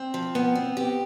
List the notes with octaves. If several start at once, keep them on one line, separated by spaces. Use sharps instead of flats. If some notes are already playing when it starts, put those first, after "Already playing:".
Already playing: C4
F3
B3
C4
G4